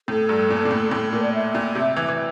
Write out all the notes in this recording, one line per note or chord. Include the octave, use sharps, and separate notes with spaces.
A2 A4
G2
A#2
A#2
A2
A2 A4
A4
A#2 A#4
D5
E5
A#2
C3
E3
E3